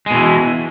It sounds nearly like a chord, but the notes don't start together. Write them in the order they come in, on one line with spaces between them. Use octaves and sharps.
G#3 B2 E3